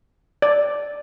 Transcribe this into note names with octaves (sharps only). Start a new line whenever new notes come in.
D5